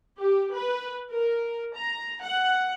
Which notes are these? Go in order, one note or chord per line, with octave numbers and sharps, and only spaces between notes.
G4
B4
A#4
A#5
F#5